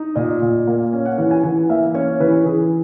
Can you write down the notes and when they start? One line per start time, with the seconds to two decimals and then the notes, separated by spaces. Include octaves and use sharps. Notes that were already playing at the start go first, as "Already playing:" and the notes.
Already playing: D#4
0.16 A#2 D#5
0.42 A#2
0.67 A#3
0.93 C#4
1.06 F#5
1.18 E3 F#5
1.31 G#5
1.43 E3 G#5
1.69 A#3 E5
1.94 C#4 C#5
2.20 E3 B4
2.45 E3 G#4